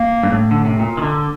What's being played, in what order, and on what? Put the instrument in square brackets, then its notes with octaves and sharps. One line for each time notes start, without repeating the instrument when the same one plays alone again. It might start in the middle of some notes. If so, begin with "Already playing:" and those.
Already playing: [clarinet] A#3
[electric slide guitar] G2
A2
D3
C3
A#2
D#3
D3